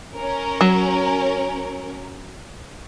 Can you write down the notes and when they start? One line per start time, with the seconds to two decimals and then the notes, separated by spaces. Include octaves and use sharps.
0.14 C#4 A#4
0.61 F#3